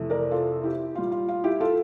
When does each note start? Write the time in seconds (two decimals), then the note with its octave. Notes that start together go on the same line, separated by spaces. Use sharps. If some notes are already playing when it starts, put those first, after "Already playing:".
Already playing: F2 C3 E3 A3
0.10 A#4 D5
0.31 F4 A4
0.63 E4 G4
0.95 A#2 G3 F4
1.12 F4
1.28 F4
1.44 E4 G4
1.60 F4 A4